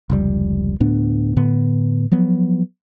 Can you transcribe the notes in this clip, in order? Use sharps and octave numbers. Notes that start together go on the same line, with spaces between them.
F1 C#2 G3
D2 A2 B3 D4
A2 D3 B3
F3 F#3 B3